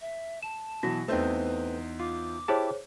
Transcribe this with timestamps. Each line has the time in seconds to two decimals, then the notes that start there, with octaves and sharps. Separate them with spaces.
0.01 E5
0.43 A5 E7
0.83 B2 E3 F#3 F#4 A#6
1.08 E2 A3 C4 D#4 B4 C5
2.00 F4 D6
2.48 E4 G4 G#4 C5 C#5 A5